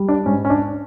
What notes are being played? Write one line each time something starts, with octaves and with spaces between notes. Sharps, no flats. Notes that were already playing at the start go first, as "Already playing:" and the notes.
Already playing: G3
D4
G#2 C#4
C#4
D4